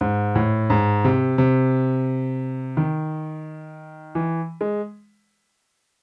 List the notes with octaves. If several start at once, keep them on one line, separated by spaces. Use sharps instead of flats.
G#2
A2
G#2
C3
C3
D#3
E3
G#3